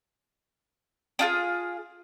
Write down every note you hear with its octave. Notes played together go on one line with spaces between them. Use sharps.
D4 F4 G#4